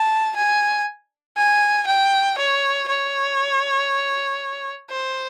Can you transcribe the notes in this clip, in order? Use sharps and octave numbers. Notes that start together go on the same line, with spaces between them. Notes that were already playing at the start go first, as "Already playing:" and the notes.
Already playing: A5
G#5
G#5
G5
C#5
C#5
C5